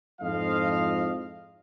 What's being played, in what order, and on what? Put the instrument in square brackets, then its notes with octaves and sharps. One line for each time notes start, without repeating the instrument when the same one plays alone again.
[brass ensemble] F2 G#2 F3 E4 D#5 F5